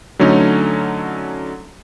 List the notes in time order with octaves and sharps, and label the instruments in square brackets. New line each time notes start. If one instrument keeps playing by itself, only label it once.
[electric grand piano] D3 F#3 A3 C#4 D#4